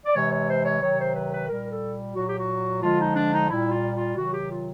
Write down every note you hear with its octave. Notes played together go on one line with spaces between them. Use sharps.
D5
C3 E3 G#3 C#5
C#5
C5
C#5
C3 D#3 F#3 C#5
C5
B4
B4
A#2 G3 A#4
A4
A#2 F#3 F#4
G4
F#4
D3 F3 G#3 F4
D#4
D4
D#4
A#2 G3 E4
F4
F4
C3 D#3 F#3 F#4
G4
F4